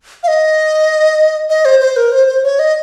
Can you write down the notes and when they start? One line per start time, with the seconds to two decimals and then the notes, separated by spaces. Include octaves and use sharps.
0.23 F5
0.28 D#5
1.49 D#5
1.65 C5
1.80 C5
1.96 A#4
2.12 C5
2.27 C5
2.43 C#5
2.59 D#5